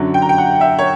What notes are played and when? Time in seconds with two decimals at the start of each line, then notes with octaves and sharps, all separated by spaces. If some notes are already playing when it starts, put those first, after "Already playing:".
Already playing: F#2 D3 F#3
0.14 G5
0.22 A#5
0.29 G5
0.38 F#5
0.61 E5
0.79 C#5